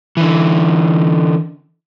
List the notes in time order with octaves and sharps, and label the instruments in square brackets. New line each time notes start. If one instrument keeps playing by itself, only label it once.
[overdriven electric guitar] D3 E3